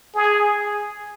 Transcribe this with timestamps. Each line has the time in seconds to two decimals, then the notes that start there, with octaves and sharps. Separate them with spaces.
0.15 G#4